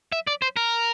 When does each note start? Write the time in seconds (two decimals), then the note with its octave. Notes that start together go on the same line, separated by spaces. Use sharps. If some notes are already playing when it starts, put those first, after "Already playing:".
0.12 E5
0.27 D5
0.42 C5
0.57 A#4